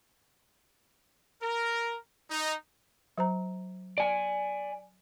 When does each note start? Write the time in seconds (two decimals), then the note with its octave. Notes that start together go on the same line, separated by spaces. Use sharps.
1.42 A#4
2.31 D#4
3.18 F#3 C5 A#5
3.98 D5 G#5